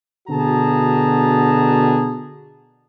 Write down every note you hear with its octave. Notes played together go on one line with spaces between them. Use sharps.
B2 D3 F#4 G#4 A5 A#5